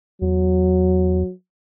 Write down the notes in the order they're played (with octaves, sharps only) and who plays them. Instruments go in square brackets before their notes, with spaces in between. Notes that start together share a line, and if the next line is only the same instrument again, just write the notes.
[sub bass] E2 [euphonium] F#3